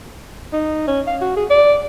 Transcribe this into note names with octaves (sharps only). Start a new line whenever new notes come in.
D#4
C#4
F5
F#4
G#4
D5